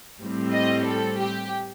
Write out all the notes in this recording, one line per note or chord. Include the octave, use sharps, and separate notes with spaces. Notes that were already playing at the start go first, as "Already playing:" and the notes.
A2 G3 C4
D#5
A4
G4